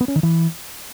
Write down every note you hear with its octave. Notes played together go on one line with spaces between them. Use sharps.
B3
C#4
D#3
E3